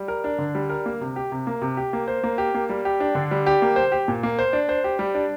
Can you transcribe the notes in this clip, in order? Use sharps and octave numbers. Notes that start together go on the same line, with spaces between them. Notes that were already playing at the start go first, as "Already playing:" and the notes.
Already playing: G3
A#4
D4
D3
G3
A#4
A#3
C3
G4
C3
A#3
C3
G4
A#3
C5
A#3
G4
A#3
G3
G4
D4
D3
G3
G4
A#3
C5
G4
A#2
A#3
C5
D4
C5
G4
G3
D4